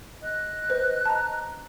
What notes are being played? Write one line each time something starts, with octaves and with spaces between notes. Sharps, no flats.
D#5 F#6
B4 C5
A5 A#5